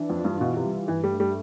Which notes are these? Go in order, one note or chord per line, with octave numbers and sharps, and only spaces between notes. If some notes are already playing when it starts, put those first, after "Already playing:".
Already playing: E3 D4
F2
F4
G2
B2 E3
C3
G3
G2 E3
G3
A3
G3